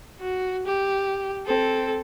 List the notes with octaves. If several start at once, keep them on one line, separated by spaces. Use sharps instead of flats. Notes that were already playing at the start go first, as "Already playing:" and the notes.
F#4
G4
C4 A4